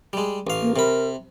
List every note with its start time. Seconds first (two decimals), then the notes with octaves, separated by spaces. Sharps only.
0.13 G3 G#3
0.47 A1 F5
0.62 A#3
0.76 C3 A#4 B5